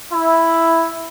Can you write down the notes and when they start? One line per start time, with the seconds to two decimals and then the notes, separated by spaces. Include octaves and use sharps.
0.11 E4